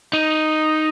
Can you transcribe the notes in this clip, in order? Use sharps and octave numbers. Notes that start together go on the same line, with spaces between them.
D#4